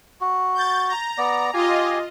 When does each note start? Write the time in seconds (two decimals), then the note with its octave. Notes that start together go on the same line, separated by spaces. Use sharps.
0.21 F#4
0.54 G6 A6
0.88 A#5
1.18 B3 D5
1.54 F4 G4 D#5 G#5